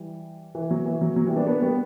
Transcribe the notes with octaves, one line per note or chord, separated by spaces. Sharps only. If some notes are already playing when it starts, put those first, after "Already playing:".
Already playing: E3 G3
E3
F#3
E3
F#3
F#3
E3 G3
B3 D4
B3 D4
G3 B3